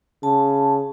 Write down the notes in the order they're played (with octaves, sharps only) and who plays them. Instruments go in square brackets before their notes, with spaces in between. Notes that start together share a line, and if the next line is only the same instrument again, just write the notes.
[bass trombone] C#3 [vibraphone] A5